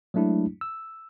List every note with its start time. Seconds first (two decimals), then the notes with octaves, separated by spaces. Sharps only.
0.14 F#3 G#3 A3 D4 E4
0.61 E6